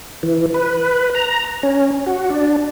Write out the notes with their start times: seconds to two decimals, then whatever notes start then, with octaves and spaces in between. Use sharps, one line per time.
0.23 E3
0.54 B4
1.15 A#5
1.63 C#4
2.06 F#4
2.30 D4